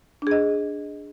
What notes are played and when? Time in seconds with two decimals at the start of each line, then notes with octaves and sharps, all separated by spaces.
0.22 D4
0.27 G#4
0.31 D#5